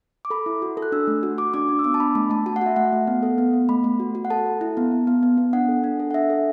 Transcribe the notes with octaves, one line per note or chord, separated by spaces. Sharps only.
D6
A4 B5
E4
F#4
A4
F#6
D4 E6
A3
F#4
F#4 D6
D4 D6
D4
E6
B3 D6
A5
D4 B5
A3 B5
A3 A5
F#4 A5
F#5
F#4 E5
A3 F#5
A3
B3
A4
B3
B3
A3 B5
A3
F#4
F#4
F#5
A4 A5
A4
E4
B3
B3
B3
B3
B3
D4 F#5
A4
D4
A4
F#5
D4 E5
A4